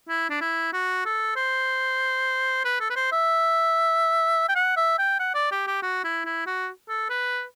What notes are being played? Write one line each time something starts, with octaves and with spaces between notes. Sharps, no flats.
E4
D4
E4
F#4
A4
C5
B4
A4
B4
C5
E5
G5
F#5
E5
G5
F#5
D5
G4
G4
F#4
E4
E4
F#4
A4
B4